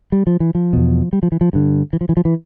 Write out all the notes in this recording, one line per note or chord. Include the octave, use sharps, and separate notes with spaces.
G3
F3
E3
F3
E2 B2
G3
F3
E3
F3
G2 D3
E3
F3
E3
F3
E3